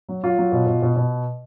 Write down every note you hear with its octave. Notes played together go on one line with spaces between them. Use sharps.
F#3
F#3 F4
F#3
B2
B2
B2
B2